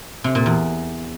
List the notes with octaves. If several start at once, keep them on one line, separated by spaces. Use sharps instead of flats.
C3
A#2
E2